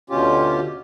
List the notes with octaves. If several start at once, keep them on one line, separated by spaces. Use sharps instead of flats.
D2 B2 C#4 F4 G4